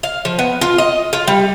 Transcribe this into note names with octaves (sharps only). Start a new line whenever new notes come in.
F5
F3
B3
F4
D#5
F4
G3